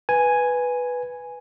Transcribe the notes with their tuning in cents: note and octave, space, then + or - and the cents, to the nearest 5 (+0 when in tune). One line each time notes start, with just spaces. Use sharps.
B4 +0 G#5 +0